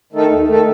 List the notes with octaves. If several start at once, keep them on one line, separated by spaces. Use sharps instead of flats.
D#3 A3 D#4 A4
D#2
D#3 A3 D#4 A4